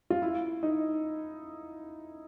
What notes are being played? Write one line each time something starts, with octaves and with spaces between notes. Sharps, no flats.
F4
E4
D#4